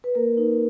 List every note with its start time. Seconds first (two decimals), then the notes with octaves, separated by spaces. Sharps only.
0.04 B4
0.15 A#3 A#4
0.37 D#4